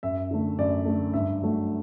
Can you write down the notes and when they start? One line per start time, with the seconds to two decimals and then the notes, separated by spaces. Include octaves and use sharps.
0.03 F#2 E5
0.31 D3 A3
0.58 F#2 D5
0.86 D3 A3
1.14 G2 E5
1.42 F#3 A3